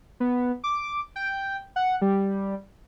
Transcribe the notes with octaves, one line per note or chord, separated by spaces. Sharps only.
B3
D6
G5
F#5
G3